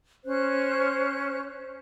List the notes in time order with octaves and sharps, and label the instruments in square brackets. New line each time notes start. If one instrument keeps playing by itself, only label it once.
[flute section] C#4 C5 F#6